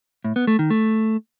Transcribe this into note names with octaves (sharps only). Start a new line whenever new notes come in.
A2
B3
A3
D#3
A3